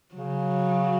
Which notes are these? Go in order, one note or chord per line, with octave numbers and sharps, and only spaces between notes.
C#3 F#3